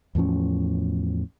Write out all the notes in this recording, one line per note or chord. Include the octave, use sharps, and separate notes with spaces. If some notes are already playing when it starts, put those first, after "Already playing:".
E2 A2 F3 C#4